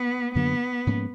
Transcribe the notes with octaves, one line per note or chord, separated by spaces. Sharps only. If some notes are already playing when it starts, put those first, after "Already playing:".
Already playing: B3
F#2 D3 F#3 A#3 B3
G#2 F3 A#3 C#4